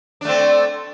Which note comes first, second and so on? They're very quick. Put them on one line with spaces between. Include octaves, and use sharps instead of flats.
D4 A3 C4